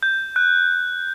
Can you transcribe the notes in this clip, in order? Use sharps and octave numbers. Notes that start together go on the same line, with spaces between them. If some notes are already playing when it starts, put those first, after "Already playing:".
G6
F#6